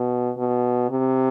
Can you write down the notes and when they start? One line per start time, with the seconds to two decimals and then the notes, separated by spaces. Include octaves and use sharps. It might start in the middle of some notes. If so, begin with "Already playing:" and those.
Already playing: B2
0.38 B2
0.90 C3